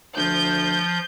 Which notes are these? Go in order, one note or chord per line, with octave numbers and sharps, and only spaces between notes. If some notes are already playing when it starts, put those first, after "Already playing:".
D2 F3 G6